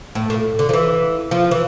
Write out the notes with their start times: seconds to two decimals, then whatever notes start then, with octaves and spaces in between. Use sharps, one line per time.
0.15 A2
0.30 A2
0.59 D3
0.69 F3
0.73 E3
1.31 F3
1.51 E3